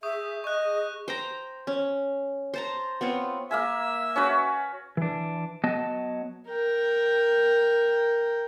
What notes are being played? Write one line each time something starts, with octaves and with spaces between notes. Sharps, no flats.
G#4 E5 C#6 D#6 G6
D#5 C#6 F#6
C5 G5 A#5
C#4
C5 A5 A#5
B3 C4 F4 C#5
A#3 E5 F5 G#5
C#4 F#4 B4
E3 D4
F#3 B3 D#5 A5
A#4 G5